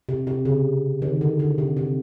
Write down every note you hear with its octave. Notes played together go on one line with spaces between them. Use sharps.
C3
C3
C#3
D#3
D3
D3
C3
C3